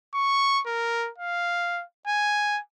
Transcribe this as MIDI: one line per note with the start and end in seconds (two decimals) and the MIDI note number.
0.14 0.61 85
0.66 1.10 70
1.18 1.84 77
2.07 2.60 80